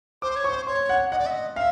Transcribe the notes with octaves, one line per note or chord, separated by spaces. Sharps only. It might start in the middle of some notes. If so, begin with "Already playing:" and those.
C5 D6
C#5
C5 C#6
C#5 C6
F#5
D#5 F#5
D5
E5
D#5
E5 F5